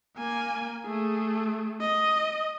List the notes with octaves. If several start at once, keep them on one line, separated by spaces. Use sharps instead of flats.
A#3 G#5
A3 G#4
D#5